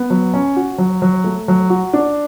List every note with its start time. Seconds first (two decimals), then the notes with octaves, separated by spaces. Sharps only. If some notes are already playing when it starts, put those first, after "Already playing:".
Already playing: B3
0.10 F#3
0.34 C#4
0.56 F#4
0.78 F#3
1.02 F#3
1.24 A3
1.48 F#3
1.70 F#4
1.93 D4